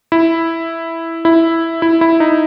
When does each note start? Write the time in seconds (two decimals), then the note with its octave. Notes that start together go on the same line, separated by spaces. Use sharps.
0.12 E4
1.25 E4
1.82 E4
2.01 E4
2.20 D#4